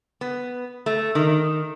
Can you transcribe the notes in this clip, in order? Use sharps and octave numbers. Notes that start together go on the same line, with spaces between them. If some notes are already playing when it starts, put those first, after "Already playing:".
B3
A3
D#3